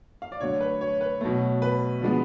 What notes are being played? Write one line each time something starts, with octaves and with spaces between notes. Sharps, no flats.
F5
D5
D3 F#3 A3 C#5
B4
C#5
B4
B2 F#3 A3
B4
D3 F3 G#3 B3